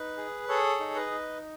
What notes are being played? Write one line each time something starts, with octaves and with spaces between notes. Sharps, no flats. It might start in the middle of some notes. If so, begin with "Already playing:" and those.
Already playing: D#4 B4
G#4
G#4 A4 C#5
D#4
B4 D#5
D#4